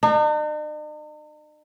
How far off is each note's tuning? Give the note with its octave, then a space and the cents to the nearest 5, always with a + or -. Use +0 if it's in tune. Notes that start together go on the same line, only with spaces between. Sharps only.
D#4 -45